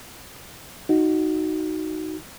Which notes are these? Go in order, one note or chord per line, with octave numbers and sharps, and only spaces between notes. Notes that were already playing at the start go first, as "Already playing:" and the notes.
D#4 F#4